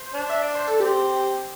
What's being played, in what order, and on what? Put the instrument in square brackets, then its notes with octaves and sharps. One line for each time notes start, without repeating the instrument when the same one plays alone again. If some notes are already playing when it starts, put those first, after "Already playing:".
Already playing: [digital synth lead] C5
[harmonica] D4
[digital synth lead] E5
D5
C5
A4
[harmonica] C4 [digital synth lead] G4